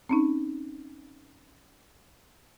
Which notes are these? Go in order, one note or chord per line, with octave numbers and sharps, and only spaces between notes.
C4 C#4 D#4